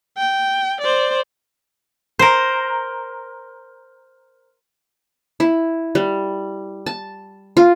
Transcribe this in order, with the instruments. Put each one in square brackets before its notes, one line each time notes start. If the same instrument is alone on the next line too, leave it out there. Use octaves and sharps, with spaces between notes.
[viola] G5
C5 D5
[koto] A#4 C5
[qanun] E4
G3
A5
F4